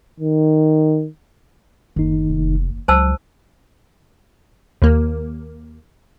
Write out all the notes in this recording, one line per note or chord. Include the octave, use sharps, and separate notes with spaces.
D#3
F#1 D#2 D#3 D#4
F1
C#2 F#3 C5 A5 E6
D#2 A#3